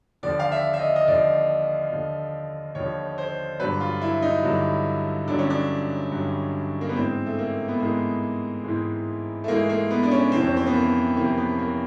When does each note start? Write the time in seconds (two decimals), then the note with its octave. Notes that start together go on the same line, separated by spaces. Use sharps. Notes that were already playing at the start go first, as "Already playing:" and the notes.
0.23 D#2 D3 F3 D5
0.39 F5
0.52 E5
0.74 E5
0.79 D#5
0.96 D#5
1.08 D#2 D3 F3 D5
1.91 D#2 D3 F3
2.75 D#2 D3 F3 C#5
3.18 C5
3.59 G2 D3 F#3 B4
3.80 F4
4.01 E4
4.22 D#4
4.43 G2 D3 F#3
5.28 G2 D3 F#3 D4
5.39 C#4
5.50 D4
6.12 G2 D3 F#3
6.81 A#3
6.89 B3
6.96 G#2 E3 G#3 C4
7.26 A3
7.38 A#3
7.68 B3
7.80 G#2 E3 G#3 A#3
8.64 G#2 E3 G#3
9.44 A3
9.48 G#2 E3 G#3 A#3
9.69 A#3
9.91 B3
10.03 D4
10.11 C#4
10.32 F2 C3 E3 C4
10.44 C#4
10.57 C4
10.66 B3
10.74 A#3
11.16 F2 C3 E3 A#3
11.37 B3
11.59 A#3